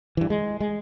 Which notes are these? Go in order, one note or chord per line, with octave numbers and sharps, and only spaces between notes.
G2 E3
G#3
G#3